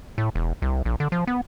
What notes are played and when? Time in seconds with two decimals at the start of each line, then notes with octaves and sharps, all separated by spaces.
0.18 A2
0.35 E1
0.62 C2
0.86 A#1
1.00 D3
1.12 F3
1.27 B3